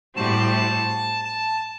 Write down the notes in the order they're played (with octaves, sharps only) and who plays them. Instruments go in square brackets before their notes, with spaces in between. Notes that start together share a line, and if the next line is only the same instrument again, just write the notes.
[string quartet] A2 G3 C4 F#4 [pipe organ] A5
[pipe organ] A5